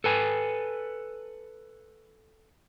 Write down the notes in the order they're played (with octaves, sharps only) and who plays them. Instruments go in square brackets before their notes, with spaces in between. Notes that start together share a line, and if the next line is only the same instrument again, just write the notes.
[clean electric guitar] A4 B4 G#5